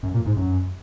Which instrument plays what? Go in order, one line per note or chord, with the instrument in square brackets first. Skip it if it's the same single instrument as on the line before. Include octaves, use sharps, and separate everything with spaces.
[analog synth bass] F#2
A#2
G#2
F#2